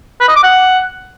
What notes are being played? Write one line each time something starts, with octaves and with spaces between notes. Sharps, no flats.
B4
D#5
D6
F#5